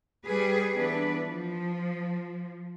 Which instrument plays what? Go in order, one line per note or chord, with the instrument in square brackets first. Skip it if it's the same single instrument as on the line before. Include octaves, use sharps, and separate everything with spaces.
[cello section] G3 G#4 B4
E3 B3 D4 B4
F3